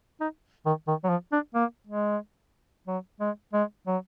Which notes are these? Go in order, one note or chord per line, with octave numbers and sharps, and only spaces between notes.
D#4
D#3
D#3
F#3
F3
D4
A#3
G#3
F#3
G#3
G#3
F#3